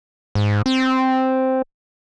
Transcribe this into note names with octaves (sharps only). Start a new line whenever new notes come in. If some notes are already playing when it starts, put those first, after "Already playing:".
G#2
C4